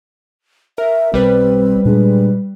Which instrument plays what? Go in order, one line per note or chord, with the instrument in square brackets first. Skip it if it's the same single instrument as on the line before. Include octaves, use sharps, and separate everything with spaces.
[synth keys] A#4 [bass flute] E5
[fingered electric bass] B1 [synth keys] G3 B4 [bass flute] C4
[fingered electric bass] A#2 D4 [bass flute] G#3